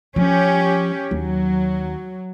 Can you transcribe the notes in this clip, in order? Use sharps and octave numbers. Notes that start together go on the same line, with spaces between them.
F3 C#4 G4
D#2 F#3